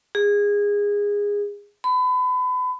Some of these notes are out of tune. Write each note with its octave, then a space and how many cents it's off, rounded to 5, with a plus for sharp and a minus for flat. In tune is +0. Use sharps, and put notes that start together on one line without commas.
G#4 -20
B5 +30